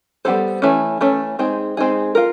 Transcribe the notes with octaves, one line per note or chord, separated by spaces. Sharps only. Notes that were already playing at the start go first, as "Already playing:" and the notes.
G3 B3 E4 A4 C5
E3 A3 C#4
E3 A3 C#4
G#3 C4 D#4 G#4
G#3 C4 D#4 G#4
F4 A#4